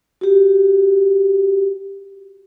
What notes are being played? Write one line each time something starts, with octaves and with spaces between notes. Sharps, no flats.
F#4 G4